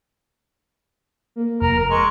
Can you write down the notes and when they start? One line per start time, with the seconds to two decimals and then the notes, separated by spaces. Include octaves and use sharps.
1.36 A#3
1.62 F1 A#4
1.79 A#4
1.90 G#3 C#6